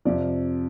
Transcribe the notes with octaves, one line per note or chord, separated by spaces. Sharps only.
F2 C3 F3 D5